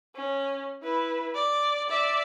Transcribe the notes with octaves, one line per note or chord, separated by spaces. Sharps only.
C#4
E4 B4
D5
D5 E5